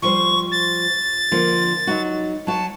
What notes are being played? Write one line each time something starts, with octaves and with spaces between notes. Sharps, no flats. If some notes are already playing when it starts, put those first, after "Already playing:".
F3 G3 C5 C#6
A6
D3 F3 A#3
F#3 D#4 F#4
F#3 F#4 A5